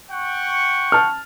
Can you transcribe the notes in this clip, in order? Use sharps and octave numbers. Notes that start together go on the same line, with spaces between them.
F#5 G5 C#6
A5 F6